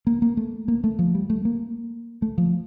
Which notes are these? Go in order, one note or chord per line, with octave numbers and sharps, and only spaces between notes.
A#3
A#3
A3
A#3
A3
F3
G3
A3
A#3
A3
F3